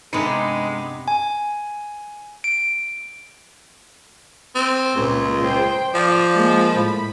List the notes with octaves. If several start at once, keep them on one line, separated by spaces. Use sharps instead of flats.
G2 C3 G#3 B3 D#4 A#5 B5 C#7
G#5
D7
C4
C#2 A#2
C5 G5
F3 D5 F5
G#3 A#3
A2 B5